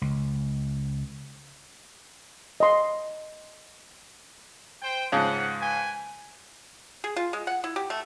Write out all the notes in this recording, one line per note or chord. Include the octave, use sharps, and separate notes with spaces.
C#2
D#5 C6
C5 G5
G#2 C#3 F3 F#5
B4 G5 G#5
G#4
F4
G#3
F#5
E4
G4
A3